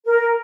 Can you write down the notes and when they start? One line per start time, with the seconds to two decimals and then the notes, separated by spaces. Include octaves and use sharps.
0.05 A#4